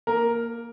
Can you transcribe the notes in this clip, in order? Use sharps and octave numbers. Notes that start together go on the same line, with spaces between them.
A#3 A#4